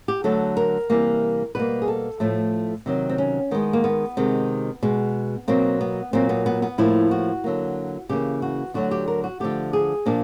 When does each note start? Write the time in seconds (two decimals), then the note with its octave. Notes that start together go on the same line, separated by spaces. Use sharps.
0.08 G4
0.24 D3 F#3 A3 A4
0.57 A#4
0.90 C3 E3 G3 A#3
1.55 B2 G3 A#3 B4
1.82 G#4
1.88 A4
2.20 A2 F3 A3
2.86 C3 D#3 F#3
3.09 C4
3.18 C#4
3.51 D#3 G#3 B3
3.73 A#3
3.84 B3
4.17 C3 D#3 G#3
4.83 B2 G#3
5.48 B2 F#3 A#3 C4
5.81 B3
6.13 A#2 F#3 A#3 C4
6.29 B3
6.46 B3
6.62 B3
6.78 A2 F3 A#3 E4
7.11 F#4
7.44 D3 F#3 A#3
8.09 C#3 E3 G3 A#3 G4
8.42 F#4
8.74 D3 F#3 A3 F#4
8.91 G4
9.08 A#4
9.24 F#4
9.40 D3 F3 A3 G4
9.73 G#4
10.06 A#2 F3 A#3 D4